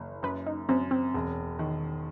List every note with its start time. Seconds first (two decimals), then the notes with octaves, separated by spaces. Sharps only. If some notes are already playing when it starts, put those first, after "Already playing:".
Already playing: F#1
0.23 F#2 B4
0.47 D#4
0.69 F#2 C4
0.91 C4
1.14 E1
1.59 D#3